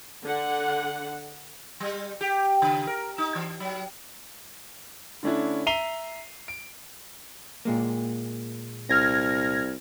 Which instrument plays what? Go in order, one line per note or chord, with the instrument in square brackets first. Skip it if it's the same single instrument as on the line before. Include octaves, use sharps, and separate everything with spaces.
[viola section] D3 F#5
[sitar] G3
G4
C#3
A#4
D#4
E3
F#3
[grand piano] D3 A3 C#4 D4 E4
E5 A#5 C7 D#7 F7 G7
D7
[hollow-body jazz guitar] A#2 G#3 A#3
[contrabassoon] C2 [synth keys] F6 G#6 A#6